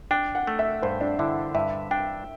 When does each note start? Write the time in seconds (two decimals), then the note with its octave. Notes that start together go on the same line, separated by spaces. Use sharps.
0.11 D4 G5
0.35 F#5
0.47 A3
0.59 E5
0.82 G2 C5
1.01 D4
1.18 D3 E4
1.55 G2 E5
1.91 D4 G5